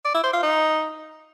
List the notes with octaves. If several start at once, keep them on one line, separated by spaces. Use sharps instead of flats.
D5
E4
C5
F4
D#4